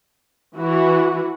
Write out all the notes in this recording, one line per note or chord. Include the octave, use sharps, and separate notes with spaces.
E3 F#4